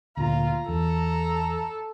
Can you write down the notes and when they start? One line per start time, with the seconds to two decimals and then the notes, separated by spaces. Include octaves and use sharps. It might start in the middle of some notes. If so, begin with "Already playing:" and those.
0.17 D2 A#2 F4 A#5
0.69 E2 A4